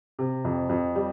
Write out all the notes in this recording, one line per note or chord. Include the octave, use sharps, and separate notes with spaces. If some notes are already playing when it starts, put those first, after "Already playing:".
C3
F2
F2
G3